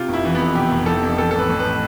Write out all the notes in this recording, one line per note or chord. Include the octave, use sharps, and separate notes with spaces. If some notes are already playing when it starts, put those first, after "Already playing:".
Already playing: C3 F4
F1 E4
E3
F2 B3
C3 G4
F1
E3 A4
F2
E3 A4
A4
A1
B4
A1
A2 B4